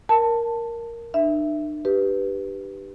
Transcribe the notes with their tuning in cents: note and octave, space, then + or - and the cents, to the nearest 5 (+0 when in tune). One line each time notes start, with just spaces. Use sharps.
A#4 +0 A5 +10
D4 +45 E5 +0
G4 +0 B4 -5